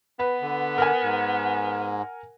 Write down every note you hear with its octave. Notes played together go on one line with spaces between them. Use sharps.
B3 B4
D3
A#4 F#5 G#5
G#2